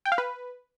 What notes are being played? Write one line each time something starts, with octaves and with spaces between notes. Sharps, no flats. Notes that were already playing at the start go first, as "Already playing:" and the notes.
G5
F5
B4